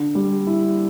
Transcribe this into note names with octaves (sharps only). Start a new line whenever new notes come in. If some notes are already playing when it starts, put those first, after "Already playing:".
Already playing: D3
G3
E4